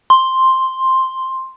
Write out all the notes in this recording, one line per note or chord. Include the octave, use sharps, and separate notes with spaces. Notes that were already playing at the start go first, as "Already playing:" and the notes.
C6